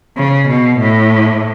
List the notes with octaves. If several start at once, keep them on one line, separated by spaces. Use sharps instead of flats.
C#3
B2
A2